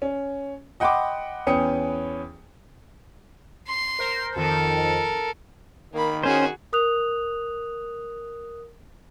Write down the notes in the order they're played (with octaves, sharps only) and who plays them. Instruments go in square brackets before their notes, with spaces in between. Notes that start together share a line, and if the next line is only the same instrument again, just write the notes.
[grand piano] C#4
D#5 F#5 G5 B5 C6 D6
E2 C#4 B4 G5 D#6 C#7
[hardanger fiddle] C6
[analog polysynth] A#4 C5
[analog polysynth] F2 D#3 [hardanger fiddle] A4 A#4
[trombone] D#3 [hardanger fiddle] A#3 B5
[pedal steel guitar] C#4 C5 [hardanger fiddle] F#4 G#4
[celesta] A#4 D#6 F#6 F7